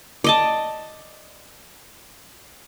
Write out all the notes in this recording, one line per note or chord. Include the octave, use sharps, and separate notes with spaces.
D5 D#5 A5